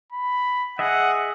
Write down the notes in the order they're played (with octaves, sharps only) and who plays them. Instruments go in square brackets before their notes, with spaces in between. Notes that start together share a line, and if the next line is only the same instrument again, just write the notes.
[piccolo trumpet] B5
[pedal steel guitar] G#4 D#5 E5 [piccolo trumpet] F#5